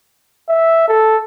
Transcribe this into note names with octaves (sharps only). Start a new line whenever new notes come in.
E5
A4